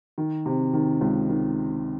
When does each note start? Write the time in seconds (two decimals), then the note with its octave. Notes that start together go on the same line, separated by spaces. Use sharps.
0.18 D#3
0.46 C3
0.74 D#3
1.01 C#2
1.29 D#3